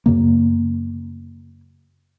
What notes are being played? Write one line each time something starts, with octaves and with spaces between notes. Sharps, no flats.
F#2 C#3 A#3